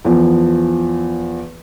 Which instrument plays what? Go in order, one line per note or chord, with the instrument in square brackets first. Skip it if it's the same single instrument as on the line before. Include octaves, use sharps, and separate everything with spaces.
[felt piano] E2 F3